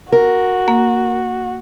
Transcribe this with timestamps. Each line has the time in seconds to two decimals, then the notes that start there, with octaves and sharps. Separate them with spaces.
0.12 F#4 A#4
0.68 A#3